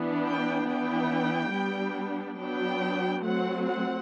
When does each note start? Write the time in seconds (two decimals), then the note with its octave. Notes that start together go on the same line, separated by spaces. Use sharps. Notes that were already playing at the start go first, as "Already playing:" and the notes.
Already playing: E3 B3 D4
0.25 G5
0.68 E3 B3 D4 G5
1.53 G3 B3 D4
2.39 F#3 B3 D4 G5
3.25 F#3 A3 C4 F#5
3.68 F#5